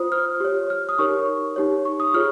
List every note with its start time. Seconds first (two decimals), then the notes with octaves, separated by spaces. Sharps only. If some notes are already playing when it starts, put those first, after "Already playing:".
Already playing: F4 C5 D#6
0.12 F6
0.40 G4 C#5
0.70 F6
0.89 D#6
0.99 D#4 G4 A#4 C#5 C#6
1.56 D#4 G4 C#5
1.85 C#6
2.00 D#6
2.14 F4 G#4 C#5 F6